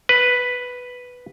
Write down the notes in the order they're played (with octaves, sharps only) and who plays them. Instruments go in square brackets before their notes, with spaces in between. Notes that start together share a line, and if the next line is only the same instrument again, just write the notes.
[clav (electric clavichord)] B4